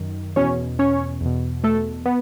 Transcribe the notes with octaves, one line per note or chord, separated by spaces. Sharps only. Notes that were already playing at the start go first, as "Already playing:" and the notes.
Already playing: F#2 D#3
E2 B2 C#4 C#5
C#4 C#5
E2 B2
A3 A4
B3